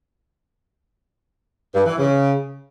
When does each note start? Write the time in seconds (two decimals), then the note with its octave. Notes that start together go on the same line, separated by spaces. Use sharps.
1.74 G2
1.86 E3
1.98 C#3